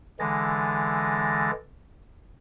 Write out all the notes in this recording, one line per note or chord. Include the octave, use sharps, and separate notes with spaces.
D3 E3 G#3 A6 A#6